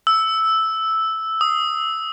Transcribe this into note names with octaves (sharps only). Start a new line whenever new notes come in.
E6
D#6